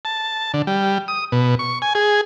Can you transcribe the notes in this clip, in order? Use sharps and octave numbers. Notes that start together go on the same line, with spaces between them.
A5
D3
G3
D#6
B2
C#6
G#5
G#4